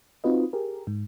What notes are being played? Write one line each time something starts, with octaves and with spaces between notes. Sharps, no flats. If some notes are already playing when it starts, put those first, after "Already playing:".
C4 D#4 F4 F#4 B4 D#5
G4 G#4 A#4
G#2